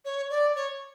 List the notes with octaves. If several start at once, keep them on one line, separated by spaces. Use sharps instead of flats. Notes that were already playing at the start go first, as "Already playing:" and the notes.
C#5
D5
C#5